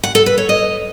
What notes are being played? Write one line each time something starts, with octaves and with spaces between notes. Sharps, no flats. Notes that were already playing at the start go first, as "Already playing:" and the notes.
F#5
A4
B4
C#5
D#5